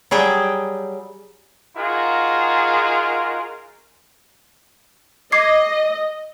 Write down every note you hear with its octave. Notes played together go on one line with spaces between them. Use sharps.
F#3 G3 G#4 G5
D#4 F4 F#4 G#4 A#4
D#5 D6 G#6 C7